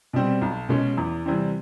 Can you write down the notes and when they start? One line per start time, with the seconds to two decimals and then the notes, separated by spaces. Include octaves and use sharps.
0.13 B2 G3 C4
0.41 B1
0.69 B2 G#3 C#4
0.97 E2
1.26 C3 E3 G3 C4